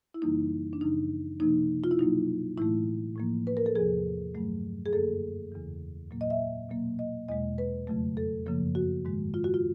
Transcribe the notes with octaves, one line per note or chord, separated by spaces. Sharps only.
E4
F#2 C#3 E3 G3 A#3 D#4
D4
F#2 C#3 F3 D#4
C3 F3 A#3 D#4
F4
E4
B2 F#3 A#3 D#4
A2 E3 A3 E4
A2 F3 A#3
B4
A#4
A4
E2 C3 F3 G#4
G2 D#3 F#3 A3
G#4
F#2 D3 F#3 A#3 A4
E2 C#3 E3
A#2 F#3 A#3
D#5
E5
B2 F#3 A#3
D#5
E2 B2 G#3 D#5
B4
F2 C#3 F#3 A3
A4
F#2 C#3 F3 A#3
F#4
G#2 D#3 G#3
F4
F#4
F4